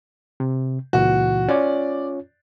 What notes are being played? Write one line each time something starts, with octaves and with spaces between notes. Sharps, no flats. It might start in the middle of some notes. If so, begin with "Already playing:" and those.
C3
C#2 A#2 E3 F#4
C#4 F4 C#5 D5